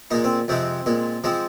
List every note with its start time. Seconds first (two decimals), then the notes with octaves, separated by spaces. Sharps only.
0.11 A#2 G#3 D#4
0.24 C4
0.48 F2 C3 G#3 C4
0.86 A#2 G#3
1.24 F3 G#3 C4